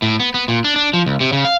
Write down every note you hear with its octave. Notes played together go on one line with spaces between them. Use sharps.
A2
B3
B3
A#2
D4
D4
F3
C#2
C3
C#3
F5